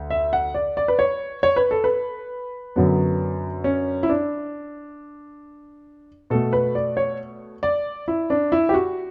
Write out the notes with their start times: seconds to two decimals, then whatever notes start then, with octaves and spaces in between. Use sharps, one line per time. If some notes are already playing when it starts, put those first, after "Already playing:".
Already playing: D2
0.10 E5
0.33 F#5
0.55 D5
0.77 D5
0.88 B4
0.99 C#5
1.43 C#5
1.56 B4
1.71 A4
1.84 B4
2.76 F#2 D3 F#3 B3
3.64 C#4
4.03 E4
4.09 D4
6.30 B2 A3 A4
6.53 B4
6.75 D5
6.97 C#5
7.63 D5
8.08 E4
8.30 D4
8.52 E4
8.69 G4
8.74 F#4